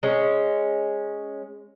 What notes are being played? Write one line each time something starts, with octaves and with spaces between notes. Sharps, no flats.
G#3 C#4